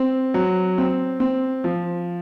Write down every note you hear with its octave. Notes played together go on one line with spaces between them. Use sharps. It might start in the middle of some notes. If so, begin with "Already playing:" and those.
Already playing: C4
F#3
C4
C4
F3